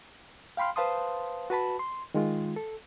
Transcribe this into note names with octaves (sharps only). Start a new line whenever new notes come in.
F5 G5 B5 C6 F6
B4 C5 F5 A5 C6 D#6
F#4 B4 A5 B5
C6
D#3 G#3 F4
A4